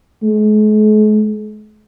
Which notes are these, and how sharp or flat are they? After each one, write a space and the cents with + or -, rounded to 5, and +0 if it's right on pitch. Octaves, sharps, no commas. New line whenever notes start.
G#3 +45